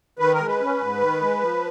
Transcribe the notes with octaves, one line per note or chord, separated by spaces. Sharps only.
D#3 B4
A#4
G#3
B4
C#4
G#2
D#3
G#3
F3